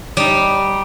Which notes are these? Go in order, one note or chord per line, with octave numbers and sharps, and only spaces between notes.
G3 D#4